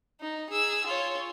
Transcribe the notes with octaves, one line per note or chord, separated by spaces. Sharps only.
D#4
G#4 E6
F4 C#5